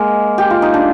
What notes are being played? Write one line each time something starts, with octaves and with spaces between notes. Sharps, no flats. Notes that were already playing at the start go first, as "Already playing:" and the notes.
Already playing: G#3 A#3
G4
F4
D#4
D4